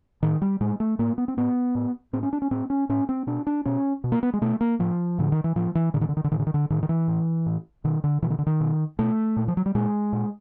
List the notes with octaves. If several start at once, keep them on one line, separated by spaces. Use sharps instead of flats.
A2 D#3
G3
A2 G#3
A3
A2 A#3
B3
C4
A2 B3
A2
A2 C4
C#4
D4
C#4
A2 C4
C#4
A2 C#4
C4
B2 D4
D4
B2 C#4
B2
A#3
B3
G#3
B2 A3
A#3
A2 F3
A2 D3
D#3
E3
A2 F3
E3
A2 D3
D#3
D3
D#3
D3
A2 D#3
D3
D#3
D3
A2 D#3
D#3
E3
A2
A2
B2 D#3
D3
B2 E3
D#3
D3
D#3
B2
B2 A3
A#2
F3
F#3
G3
A#2 G#3
A#2